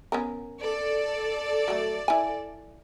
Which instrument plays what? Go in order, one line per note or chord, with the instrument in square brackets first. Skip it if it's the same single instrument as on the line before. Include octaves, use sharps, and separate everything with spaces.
[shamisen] B3 C#4 A#4
[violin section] A4 D5
[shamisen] F#3 A3
E4 G#5